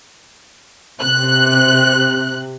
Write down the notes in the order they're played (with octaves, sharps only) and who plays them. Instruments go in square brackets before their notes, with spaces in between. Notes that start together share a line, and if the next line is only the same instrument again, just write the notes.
[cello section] C3 [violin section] F#6